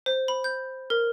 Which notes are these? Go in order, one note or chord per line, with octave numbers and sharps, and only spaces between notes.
C5
B5
G6
A#4